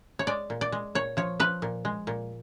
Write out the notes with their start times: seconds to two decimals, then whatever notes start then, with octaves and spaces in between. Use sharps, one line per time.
0.19 C#5
0.27 G#3 D5
0.50 A#2
0.61 D5
0.72 G#3
0.95 A#2 C#5
1.17 F3 C#5
1.40 F3 B4
1.62 A#2
1.85 G#3
2.07 A#2